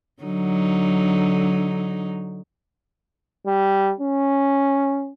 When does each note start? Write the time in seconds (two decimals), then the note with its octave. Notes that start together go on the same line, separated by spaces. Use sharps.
0.22 D3 F#3 D#4
3.47 G3
4.00 C#4